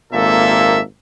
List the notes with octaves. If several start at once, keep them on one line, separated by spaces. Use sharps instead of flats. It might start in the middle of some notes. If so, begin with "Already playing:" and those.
G#1 A#2 A#3 A4 E5